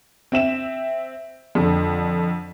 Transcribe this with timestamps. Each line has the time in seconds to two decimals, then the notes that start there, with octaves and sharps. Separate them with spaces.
0.32 C4 E5 E7
1.55 F2 D3